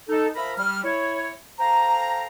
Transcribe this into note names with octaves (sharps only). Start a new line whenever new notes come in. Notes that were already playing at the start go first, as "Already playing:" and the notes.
D#4 A4
F3 A#4 E5 A#5 B5
G3 F6
E4 C#5
A4 C5 F5 G5 A#5